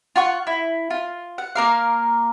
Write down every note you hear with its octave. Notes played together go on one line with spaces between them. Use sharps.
F4 F#5 C#6
E4
F4
F#5
A#3 A#4 F5